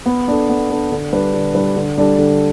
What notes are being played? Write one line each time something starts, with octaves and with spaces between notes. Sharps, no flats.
B3
D4 A4
B3
D4 A4
D3
G3 D4 B4
D3
G3 D4 B4
D3
G3 D4 A4
D3